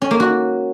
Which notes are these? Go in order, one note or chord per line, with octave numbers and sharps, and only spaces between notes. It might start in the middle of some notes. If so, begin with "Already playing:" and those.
C#4
A#3
F#4